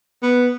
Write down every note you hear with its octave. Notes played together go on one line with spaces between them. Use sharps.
B3